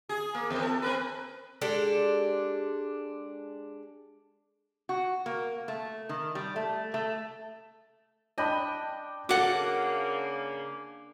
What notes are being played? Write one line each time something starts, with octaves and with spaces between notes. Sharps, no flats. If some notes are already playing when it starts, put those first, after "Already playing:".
G#4
A#3
E2
A4
C4 A#4 B4
G#3 D4 G4 A4
F#4
A#3
A3
D#3
G3
A3
A3
D4 D#5 G5 B5
C#3 A#3 F#4 A4 F#5 D6